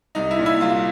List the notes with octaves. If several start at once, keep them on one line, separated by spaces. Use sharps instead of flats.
C2 D#4
E4
A#2
E4
C2 F4